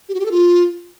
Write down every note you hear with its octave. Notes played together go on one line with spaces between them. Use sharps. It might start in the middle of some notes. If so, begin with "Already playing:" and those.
G4
F#4
G4
A4
F4